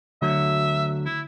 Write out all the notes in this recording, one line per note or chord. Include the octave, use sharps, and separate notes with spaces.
D2 D3 F#3 E5
E4